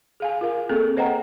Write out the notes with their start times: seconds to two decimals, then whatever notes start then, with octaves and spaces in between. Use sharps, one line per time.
0.20 G#4 F5 G#5
0.41 F4 A#4 F5
0.69 A#3 C4 G#4 A4
0.97 B4 C5 D#5 F#5 G5 A#5